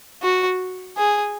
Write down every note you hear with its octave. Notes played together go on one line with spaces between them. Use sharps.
F#4
G#4